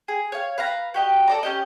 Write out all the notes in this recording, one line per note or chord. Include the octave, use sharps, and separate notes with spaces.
G#4
C#5 F5
B4 F5 A#5
F#4 G4 D#5
A4 D5 A#5
C#4 G4 D#5